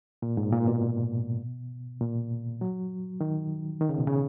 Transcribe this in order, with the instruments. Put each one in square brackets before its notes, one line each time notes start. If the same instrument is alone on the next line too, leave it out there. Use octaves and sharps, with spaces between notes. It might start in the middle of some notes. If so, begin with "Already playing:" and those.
[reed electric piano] A#2
G#2
A#2
B2
A#2
F#3
D#3
D#3
C#3
B2
C#3